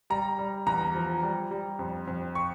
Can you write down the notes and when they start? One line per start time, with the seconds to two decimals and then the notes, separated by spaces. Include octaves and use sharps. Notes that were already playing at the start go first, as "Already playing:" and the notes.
0.10 G3 A#5
0.39 G3
0.66 E2 A#5
0.95 F3
1.23 G3
1.51 G3
1.79 F2
2.07 F2
2.35 C#6